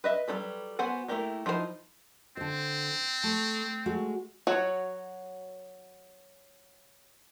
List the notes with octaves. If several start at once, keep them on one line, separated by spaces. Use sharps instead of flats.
B4 D#5 E5
F#3 G3 D#4 A4 B4
B3 F#4 C5 F#5 G#5
A3 A#3 E4 G4 A#4
F3 D#4 E4 G#4 C5
D3 C4 C5
A3
G#3 A3 F#4
F#3 F#4 C#5